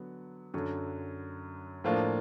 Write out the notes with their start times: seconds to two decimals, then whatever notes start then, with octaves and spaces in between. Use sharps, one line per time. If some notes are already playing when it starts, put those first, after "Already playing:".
Already playing: D3 F#3 B3
0.54 F#2 D3 F#3
1.84 A2 F3 A#3 D4 F4